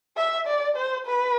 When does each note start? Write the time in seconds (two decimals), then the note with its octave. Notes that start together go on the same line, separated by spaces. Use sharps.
0.17 E5
0.47 D5
0.76 C5
1.06 B4